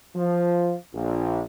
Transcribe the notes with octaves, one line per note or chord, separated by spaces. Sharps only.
F3
A#1